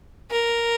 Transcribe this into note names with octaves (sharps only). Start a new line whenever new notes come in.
A#4